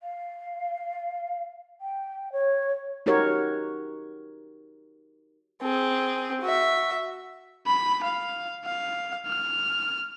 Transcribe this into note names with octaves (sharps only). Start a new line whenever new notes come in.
F5
G5
C#5
D#4 F#4 G4 A#4 C#5
C4 G#4
F#4 E5
B5
F5
F5
F6